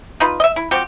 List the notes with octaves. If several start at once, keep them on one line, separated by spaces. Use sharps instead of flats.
D#4 F4 B4
D#5 E5
E4
F3 C4 F#4 G4